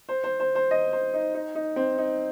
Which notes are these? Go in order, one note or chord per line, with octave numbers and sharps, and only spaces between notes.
C5
C5
C5
C5
D#5
C5
D#4
D#4
D#4
C4
D#4